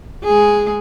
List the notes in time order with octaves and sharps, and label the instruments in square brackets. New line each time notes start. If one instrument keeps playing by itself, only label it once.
[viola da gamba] G#3 G#4